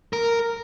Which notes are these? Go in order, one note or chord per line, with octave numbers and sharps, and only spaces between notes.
A#4